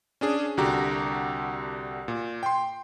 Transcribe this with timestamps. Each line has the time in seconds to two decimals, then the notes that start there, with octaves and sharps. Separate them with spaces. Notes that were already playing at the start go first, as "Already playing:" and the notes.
0.21 C#4 D4 G#4
0.57 C2 D3 F#4 G4 A#5
2.08 A#2
2.43 G5 C6